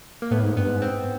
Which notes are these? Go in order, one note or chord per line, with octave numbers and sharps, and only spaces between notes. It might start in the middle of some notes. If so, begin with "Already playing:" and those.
A#3
A2 B3
G#2
G2 B3
G#2
C4